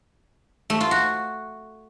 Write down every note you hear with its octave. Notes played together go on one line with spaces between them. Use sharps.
A3
F4
F#4